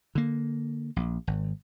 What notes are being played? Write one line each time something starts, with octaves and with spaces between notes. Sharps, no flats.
D3 A#3
A#1
G#1